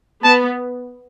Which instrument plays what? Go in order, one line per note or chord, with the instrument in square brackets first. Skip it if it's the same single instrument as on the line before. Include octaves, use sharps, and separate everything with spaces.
[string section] B3 [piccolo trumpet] A5